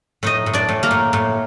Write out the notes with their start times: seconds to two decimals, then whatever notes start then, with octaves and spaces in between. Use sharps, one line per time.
0.23 A2 D#4 D#5
0.46 A2
0.53 D4 D5
0.69 A2
0.83 A#3 A#4
0.91 A2
1.13 A2